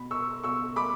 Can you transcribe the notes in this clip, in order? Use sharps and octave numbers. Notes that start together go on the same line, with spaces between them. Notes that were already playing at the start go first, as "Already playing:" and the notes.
Already playing: B2 B5
C#6 E6
B2 C#6 E6
B5 D6